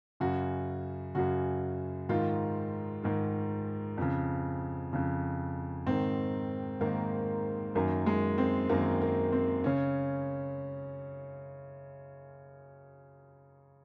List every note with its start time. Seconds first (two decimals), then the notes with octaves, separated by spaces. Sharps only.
0.20 F#2 C#3 F#4
1.15 F#2 C#3 F#4
2.09 G#2 D#3 F4
3.04 G#2 D#3
3.97 F2 C#3
4.93 F2 C#3
5.86 G#2 D#3 C4
6.81 G#2 D#3 A#3
7.75 F#2 D#3 A#3
8.06 G#3
8.38 C4
8.69 F#2 D#3 A#3
9.01 A#3
9.32 C4
9.64 C#3 C#4